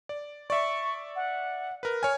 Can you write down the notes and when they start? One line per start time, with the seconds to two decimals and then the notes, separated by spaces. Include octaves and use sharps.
0.09 D5
0.50 D5 E5 C#6
1.16 F#5
1.83 A#4 B4
2.03 C#5 G#5 F6